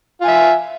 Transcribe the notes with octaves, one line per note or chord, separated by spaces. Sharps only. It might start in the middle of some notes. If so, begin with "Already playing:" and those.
F4 E5 G#5